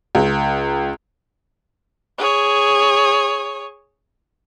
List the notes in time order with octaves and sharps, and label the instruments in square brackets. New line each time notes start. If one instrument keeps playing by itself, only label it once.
[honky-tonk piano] C#2
[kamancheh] G#4 C#5